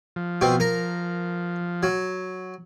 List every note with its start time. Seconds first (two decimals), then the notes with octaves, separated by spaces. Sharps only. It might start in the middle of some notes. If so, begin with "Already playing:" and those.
0.16 F3
0.41 B2 C4
0.60 A#4
1.83 F#3